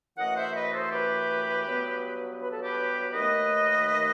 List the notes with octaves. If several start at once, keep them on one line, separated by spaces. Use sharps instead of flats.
F#2 E3 A3 D#5 F#5
C5 E5
B4 D#5
D#5
A4 C5
G4 B4
G2 F#3 B3
B4
A4
G4 B4
D#2 D#3 A3 B4 D#5